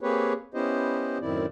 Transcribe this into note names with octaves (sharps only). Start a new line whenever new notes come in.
A#3 C4 G4 G#4 B4 C#5
B3 C#4 E4 G4 C5 D#5
F#2 A2 D#3 C4 E4 D5